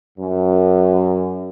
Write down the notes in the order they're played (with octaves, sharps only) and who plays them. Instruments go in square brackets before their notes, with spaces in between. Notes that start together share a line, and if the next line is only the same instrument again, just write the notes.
[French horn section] F#2